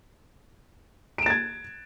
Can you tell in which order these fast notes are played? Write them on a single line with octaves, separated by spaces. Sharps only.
D7 E7 A6 G#6